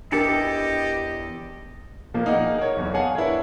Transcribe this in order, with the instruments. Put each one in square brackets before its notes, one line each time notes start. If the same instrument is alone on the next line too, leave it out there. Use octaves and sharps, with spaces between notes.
[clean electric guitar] E2 E4 A4 [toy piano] D4 A#4 [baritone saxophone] G4 [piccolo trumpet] D#5
[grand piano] A#2 F3 A#3
A#3 D#4 G#4 A#4 D#5 F#5
A#4 C#5
B1 E2
G#4 C#5 F5 F#5 G#5 A5
D4 E4 A#4 B4 C#5